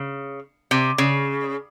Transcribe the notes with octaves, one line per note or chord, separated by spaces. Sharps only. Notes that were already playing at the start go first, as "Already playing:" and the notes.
Already playing: C#3
C3
C#3